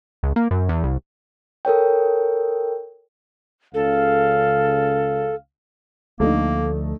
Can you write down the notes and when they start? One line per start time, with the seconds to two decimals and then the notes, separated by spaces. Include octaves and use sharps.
0.23 C#2
0.36 A#3
0.51 F#2
0.69 E2
0.84 C2
1.65 A4 A#4 C#5 G5
3.74 C#2 C#3 A4 F5
6.20 D2 F3 A3 A#3 D4 D#4